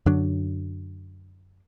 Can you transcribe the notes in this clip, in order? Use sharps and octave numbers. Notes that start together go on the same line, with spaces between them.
F#2 D3 F#3 D4